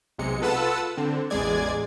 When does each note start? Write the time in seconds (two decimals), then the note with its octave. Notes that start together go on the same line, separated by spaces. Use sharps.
0.18 B1 C3 G#3 C#7
0.42 F4 A4 B4 F#5 A5 E6
0.97 D3 C4
1.30 A1 E2 G#3 G#4 D5 G#6